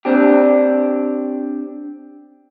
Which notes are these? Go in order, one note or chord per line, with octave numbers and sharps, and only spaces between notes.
C4 D4 G4